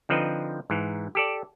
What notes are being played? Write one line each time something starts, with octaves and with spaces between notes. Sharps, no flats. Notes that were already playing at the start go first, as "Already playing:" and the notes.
D3 F3 C4 D#4 B4 D#5
G#2 E3
G4 A4 D5